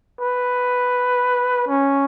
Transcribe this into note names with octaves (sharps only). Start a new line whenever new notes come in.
B4
C#4